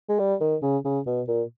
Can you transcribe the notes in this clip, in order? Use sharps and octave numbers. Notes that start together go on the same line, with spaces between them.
G#3
G3
D#3
C#3
C#3
B2
A#2